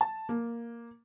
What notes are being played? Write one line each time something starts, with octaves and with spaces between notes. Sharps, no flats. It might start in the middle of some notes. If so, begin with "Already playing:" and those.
A5
A#3